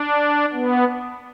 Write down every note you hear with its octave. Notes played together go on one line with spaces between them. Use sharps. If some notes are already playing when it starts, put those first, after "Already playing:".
Already playing: D4
B3